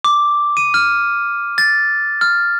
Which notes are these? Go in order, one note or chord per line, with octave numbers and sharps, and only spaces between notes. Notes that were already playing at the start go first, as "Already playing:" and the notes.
D6
D#7
F6
A6
F6